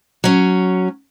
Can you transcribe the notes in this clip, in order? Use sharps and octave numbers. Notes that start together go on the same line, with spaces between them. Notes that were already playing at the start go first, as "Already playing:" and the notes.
F#3 C#4